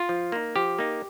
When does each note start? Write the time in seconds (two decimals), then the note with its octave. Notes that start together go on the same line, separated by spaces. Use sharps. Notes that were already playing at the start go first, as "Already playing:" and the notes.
Already playing: F4
0.09 F3
0.32 A#3 D#4
0.56 F3 G4
0.79 A#3 D#4